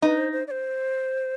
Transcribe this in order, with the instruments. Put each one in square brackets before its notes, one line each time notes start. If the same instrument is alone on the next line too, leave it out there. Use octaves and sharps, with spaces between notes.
[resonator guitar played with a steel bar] D#4 [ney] B4
[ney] C5
C5
D5
C5